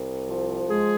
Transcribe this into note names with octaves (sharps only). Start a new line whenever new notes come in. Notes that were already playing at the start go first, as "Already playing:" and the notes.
Already playing: C2
F3
G#3 G#4